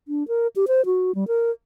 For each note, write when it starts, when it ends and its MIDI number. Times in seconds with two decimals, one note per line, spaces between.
0.08 0.26 62
0.28 0.47 70
0.56 0.65 67
0.68 0.85 72
0.86 1.15 66
1.15 1.28 55
1.28 1.51 70